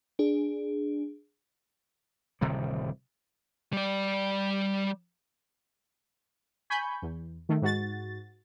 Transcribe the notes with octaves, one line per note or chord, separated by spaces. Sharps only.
D4 G#4
D1 C3 D#3 G3
G3 D5
G#5 B5 C#6 G6
E2
D#3 A3
G#2 F#4 A6